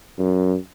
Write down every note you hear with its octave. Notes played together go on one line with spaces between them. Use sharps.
F#2